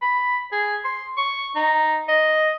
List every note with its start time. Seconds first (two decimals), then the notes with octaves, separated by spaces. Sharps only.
0.02 B5
0.52 G#4
0.84 C6
1.17 C#6
1.56 D#4
2.08 D#5